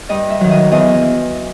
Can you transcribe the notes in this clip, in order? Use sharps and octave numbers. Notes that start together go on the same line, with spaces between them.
G2 D#5
E5
D#3 F#3
D#5
E2 D#5